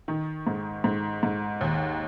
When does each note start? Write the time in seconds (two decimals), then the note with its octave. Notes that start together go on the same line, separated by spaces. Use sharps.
0.08 D#3
0.47 G#2
0.84 G#2
1.23 G#2
1.61 D#2